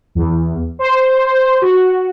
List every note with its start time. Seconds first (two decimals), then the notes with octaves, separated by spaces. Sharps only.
0.15 E2
0.79 C5
1.62 F#4